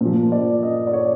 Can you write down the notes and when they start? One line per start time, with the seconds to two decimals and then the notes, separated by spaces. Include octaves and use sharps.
0.01 A#2 F3
0.32 D5
0.63 D#5
0.87 D5
0.93 C#5